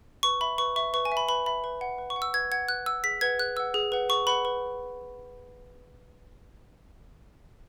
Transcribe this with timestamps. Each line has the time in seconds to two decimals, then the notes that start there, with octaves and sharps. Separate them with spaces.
0.23 B4 C#6
0.41 E5 B5
0.58 B4 C#6
0.76 E5 C#6
0.94 B4 C#6
1.05 G#5
1.12 E5
1.17 B5
1.28 B4 B5
1.46 E5 B5
1.64 B4
1.81 F#5
1.98 B4
2.10 C#6
2.16 F#5
2.22 E6
2.34 B4 G#6
2.52 F#5 G#6
2.69 B4 F#6
2.86 F#5 E6
3.04 G#4 B6
3.21 B4 F#5 G#6
3.39 G#4 F#6
3.56 B4 F#5 E6
3.74 G#4
3.92 B4 F#5
4.09 G#4 C#6
4.27 B4 F#5 B5
4.45 B4